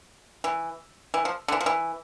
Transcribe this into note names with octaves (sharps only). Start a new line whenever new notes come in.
E3
E3
F3
D3
E3
F3
E3